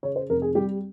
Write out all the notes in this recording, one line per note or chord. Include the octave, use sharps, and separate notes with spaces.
C#3 C#5
C5
F1 A#4
G#4
G3 G4